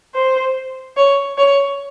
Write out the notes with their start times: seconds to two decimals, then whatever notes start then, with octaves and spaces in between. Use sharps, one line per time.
0.15 C5
0.97 C#5
1.38 C#5